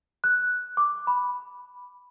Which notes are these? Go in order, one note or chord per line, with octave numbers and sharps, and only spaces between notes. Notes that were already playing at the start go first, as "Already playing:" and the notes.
F#6
D6
B5